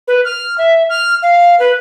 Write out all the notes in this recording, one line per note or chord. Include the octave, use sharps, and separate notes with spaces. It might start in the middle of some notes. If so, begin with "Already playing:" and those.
B4
F6
E5
F6
F5
B4